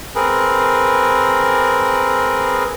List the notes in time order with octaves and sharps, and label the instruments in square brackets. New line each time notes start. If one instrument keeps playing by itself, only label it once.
[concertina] C4 G#4 A#4 B4